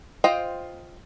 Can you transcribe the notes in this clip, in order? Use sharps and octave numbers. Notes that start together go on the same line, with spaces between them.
F4 C5 D#5 G5